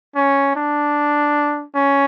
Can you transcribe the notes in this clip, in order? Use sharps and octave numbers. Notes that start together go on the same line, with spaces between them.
C#4
D4
C#4